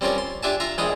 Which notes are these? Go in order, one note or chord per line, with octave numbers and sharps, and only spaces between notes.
G3 C4 C#4 F4 A#4 D5
C6
D4 F4 G4 E5 G#5 A5
F4 E5 F5 A#5
A#1 G#3 E4 F4 G5 D#6